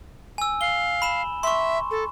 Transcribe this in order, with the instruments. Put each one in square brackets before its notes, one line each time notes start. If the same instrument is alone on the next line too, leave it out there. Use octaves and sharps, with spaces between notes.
[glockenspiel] G#5 E6
[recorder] F5 [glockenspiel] G7
[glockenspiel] B5 E7
[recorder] E5 [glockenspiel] C6 C#6
[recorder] A4